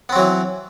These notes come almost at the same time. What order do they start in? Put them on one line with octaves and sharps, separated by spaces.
B3 C4 F#3 E3